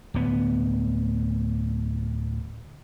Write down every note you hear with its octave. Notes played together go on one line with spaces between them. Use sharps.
D1 B3